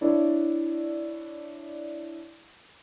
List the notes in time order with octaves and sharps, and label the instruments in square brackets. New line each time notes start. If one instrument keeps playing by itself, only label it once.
[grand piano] D4 E4 C#5 D5